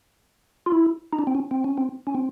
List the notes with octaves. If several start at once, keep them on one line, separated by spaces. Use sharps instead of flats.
F4
E4
D#4
D4
C4
C#4
C4
C#4
C4
C#4
C4